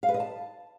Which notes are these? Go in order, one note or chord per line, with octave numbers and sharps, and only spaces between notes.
F5
B4
D#5
A5